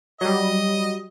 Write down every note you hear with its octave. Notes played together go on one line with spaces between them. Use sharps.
F#3 G3 D#5